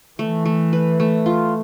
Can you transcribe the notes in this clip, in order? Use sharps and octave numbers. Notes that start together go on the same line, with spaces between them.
E3 A3
A3
B4
A3
F4